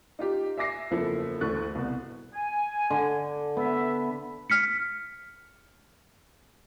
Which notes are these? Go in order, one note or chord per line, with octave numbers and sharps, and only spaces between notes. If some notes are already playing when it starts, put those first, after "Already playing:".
D#4 F4 G4
E5 G#5 D6 A#6 C7
F#1 E2 F3 E4 A4
D2 E3 A3 C#6 F#6 A6
C2 B2
G#5
D3
B3 E5
F6 B6 C#7